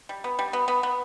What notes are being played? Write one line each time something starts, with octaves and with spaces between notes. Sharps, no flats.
G3
B3
G3
B3
B3
B3